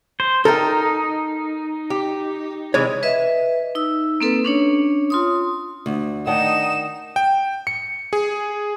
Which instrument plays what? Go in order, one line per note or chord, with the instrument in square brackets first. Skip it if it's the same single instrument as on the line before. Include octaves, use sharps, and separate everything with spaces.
[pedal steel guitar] C5
[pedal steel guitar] D#4 [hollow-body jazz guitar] A4 G5 [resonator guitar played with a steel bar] A#4
[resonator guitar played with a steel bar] G4
[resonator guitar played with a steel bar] C3 E3 G#3 [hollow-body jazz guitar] C#5
[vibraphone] B4 D#5 E5
D#4 E6
A#3 C4 A4 B4
C#4 D4 C#5
F4 C6 D#6
[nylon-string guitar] D2
[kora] D#3 D4 G5 [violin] D#4 E7 [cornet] D#5 [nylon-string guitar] F#5
[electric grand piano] G5
C#7
G#4